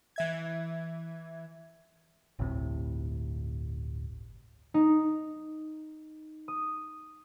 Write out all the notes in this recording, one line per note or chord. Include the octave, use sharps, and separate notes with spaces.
E3 E5 G#6
G1 D2 A2 C3
D#4
D#6